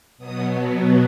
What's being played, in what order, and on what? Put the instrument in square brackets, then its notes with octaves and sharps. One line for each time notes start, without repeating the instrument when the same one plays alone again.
[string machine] B2 F#3 B3 D#6